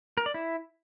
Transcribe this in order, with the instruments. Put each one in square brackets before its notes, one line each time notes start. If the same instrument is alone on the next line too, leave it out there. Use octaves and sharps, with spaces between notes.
[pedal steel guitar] A#4
D5
E4